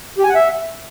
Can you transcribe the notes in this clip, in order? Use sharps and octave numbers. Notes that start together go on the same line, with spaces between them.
G4
G#5
F#5
E5